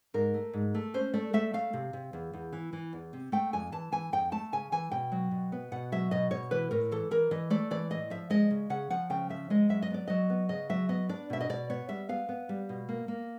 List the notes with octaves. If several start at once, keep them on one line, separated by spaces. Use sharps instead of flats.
G#2 A#4
A3
G#2
A3
C#4 C5
A3 D5
A3 E5
A3 F5
C3
C3
E2
E2
E3
E3
E2
C3
A3 G5
F2 G#5
E3 A5
E3 G#5
F2 G5
A3 A5
C#3 G#5
E3 G#5
B2 G5
F#3
B2
B3
B2 F#5
F#3 E5
B2 D#5
B2 C#5
E3 B4
A2 A#4
E3 A4
E3 A#4
E3 D#5
A3 D5
E3 D5
A2 D#5
F3 E5
G#3 D#5
C#3
C#3 F#5
F3 F#5
C#3 G5
F3 E5
G#3 D#5
F#3 E5
D#5
B3 D5
F#3 D#5
B3
C#3 D#5
F#3 E5
B3 D#5
D4 D5
B2 E5
D#5
B2 D5
B3 C#5
G3 E5
B3 F5
B3
G3
B2
A#3
A#3